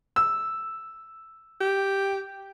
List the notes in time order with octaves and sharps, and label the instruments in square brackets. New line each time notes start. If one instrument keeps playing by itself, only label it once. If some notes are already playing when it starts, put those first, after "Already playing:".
[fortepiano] E6
[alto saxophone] G4